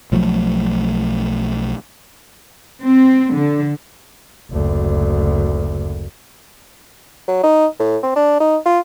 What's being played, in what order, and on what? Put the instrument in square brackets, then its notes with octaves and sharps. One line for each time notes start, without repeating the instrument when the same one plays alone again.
[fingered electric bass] B1 F3 F#3 A3
[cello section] C4
D3
[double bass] F#1 D2
[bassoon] F#3
D#4
A2
C4
D4
D#4
F4